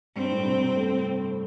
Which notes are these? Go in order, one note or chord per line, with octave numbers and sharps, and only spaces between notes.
G2 C4
A2
C3
C3
A3